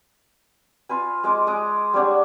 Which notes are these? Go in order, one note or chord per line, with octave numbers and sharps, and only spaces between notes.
F4 B4 G#5
G#3 D#5 D6
G#3 D6 D#6
G3 D4 C#5 F#5